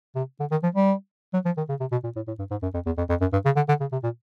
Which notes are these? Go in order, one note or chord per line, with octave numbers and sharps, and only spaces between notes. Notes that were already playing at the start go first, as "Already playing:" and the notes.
C3
D3
D#3
F3
G3
F#3
F3
D#3
C#3
C3
B2
A#2
A2
A2
G2
G#2
F#2
F2
E2
F2
F2
F#2
G2
C#3
D3
D3
C#3
C3
A#2